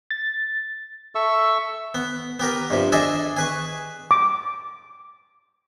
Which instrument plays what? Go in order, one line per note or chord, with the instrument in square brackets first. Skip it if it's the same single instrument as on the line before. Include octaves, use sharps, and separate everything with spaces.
[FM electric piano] A6
[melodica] A4 E5 C#6 E6
[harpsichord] B3
B3 G4 A#4 B4
G2 C3 F3
D4 G#4 A4 D#5 E5
G#4 B4 C#6
[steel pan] D6